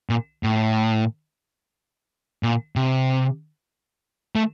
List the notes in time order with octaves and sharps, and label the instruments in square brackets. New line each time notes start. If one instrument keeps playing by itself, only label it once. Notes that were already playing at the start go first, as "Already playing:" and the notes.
[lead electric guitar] A#2
A2
A#2
C3
A3